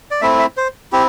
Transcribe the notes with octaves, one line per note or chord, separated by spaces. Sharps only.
D5
A3 C4 E4 E5
E5
C5
C4 E4 G4